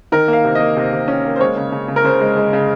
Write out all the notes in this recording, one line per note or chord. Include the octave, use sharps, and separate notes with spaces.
D#3 A#4
A#3
F5
C3
A#3 D#5
C3
C3
C#4
A#3
C5
G#3 C#5
C#3
C#3
C#3
A#4
C#3 C5
G#3
G#3
C#3